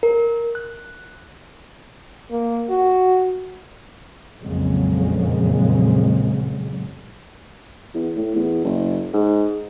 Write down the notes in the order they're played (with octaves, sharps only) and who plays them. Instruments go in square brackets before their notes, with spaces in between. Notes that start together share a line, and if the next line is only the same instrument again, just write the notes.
[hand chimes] A#4
F#6
[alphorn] A#3
F#4
[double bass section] A#1 F2 A#2 C#3 F#3 G#3
[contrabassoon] E2
A2
E2
F#1
G#2